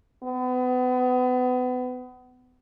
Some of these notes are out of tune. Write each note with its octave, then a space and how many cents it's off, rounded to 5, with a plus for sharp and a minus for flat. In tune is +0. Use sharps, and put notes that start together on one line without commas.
B3 +30